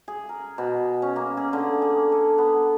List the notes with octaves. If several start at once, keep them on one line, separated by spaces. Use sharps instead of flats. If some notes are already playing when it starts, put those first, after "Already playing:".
G#4
A#4
B2
C#4
A#3
G#4
D3
G#4
A4
B3